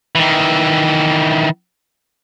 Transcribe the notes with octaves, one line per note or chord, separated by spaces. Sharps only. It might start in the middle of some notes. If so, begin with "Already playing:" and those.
D#3 E3